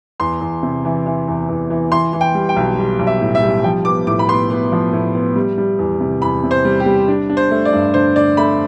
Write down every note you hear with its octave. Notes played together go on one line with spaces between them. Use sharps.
E2 C6
E2
C3
E3
E3
E2
E2
E3
E3 C6
E3
G5
G3
G5
B1
G3
B1
E5
A2
E5
G3
F3 G5
B3 D6
A2 D6
B5
B3 C6
B3
F3
A2
B3
G3
G3
E2
C3
E2 B5
C3
C5
G3
G4
G3
D4
D4
C5
A3
D5
G2
D3 C5
D3 D5
A3 B5